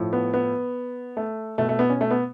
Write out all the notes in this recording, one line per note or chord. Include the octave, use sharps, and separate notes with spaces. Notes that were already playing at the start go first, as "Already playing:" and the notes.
Already playing: A2 F3
B3
B3
A3
B2 A3
A3
B3
C#4
A3
B3